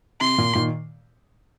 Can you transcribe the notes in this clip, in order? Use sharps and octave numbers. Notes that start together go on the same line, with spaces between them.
C3 C6
A#2
A#2 D#3